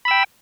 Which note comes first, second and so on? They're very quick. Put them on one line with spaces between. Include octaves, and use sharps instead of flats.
B5 E6 G5